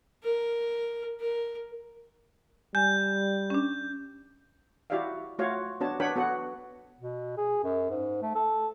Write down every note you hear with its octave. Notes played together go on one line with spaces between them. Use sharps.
A#4
A#4
G3 G#5 G6
C#4 D4
E4 F#4 G4 D5 E5 F5
A3 F4 F#4 C#5 F5
B3 D4 F#4 C#5 A5
D4 B4 C#5 F#5 G5 B5
B3 F#4 A4 F#5
B2
G#4
F#2
G#2
A3
A4